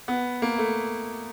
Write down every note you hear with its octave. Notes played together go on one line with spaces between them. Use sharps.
B3
A#3
A3